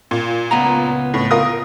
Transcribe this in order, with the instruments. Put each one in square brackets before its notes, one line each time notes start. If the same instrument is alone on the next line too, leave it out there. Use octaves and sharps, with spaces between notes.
[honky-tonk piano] A#2
[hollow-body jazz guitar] C#2 B3 A#5
[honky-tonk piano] A2
F4 A#4 D#6